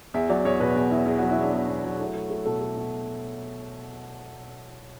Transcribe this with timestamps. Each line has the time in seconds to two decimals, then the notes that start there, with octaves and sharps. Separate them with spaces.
0.14 E2 E5
0.29 F#3 D5
0.45 E2 C#5
0.60 B2 B4
0.76 E2
0.91 E2 E4
1.06 E2 G#4
1.18 F#4
1.23 F#3
1.30 E4
1.38 E2 D4
1.53 E2 D4
1.69 E2
1.84 F#3
1.99 A3 E4
2.15 A3
2.30 A3
2.46 B2 A4
2.61 A3
2.77 B2